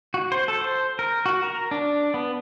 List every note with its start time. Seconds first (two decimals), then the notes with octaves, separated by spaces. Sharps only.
0.14 F#4
0.32 C5
0.48 A4
0.61 C5
0.99 A#4
1.26 F#4
1.43 A#4
1.71 D4
2.14 B3